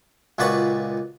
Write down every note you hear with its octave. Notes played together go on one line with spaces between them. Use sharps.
C#2 A#2 F#4 B4 D5 C#6